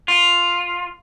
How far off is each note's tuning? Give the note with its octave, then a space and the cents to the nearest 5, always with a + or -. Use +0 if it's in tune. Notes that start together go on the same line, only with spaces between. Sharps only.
F4 +5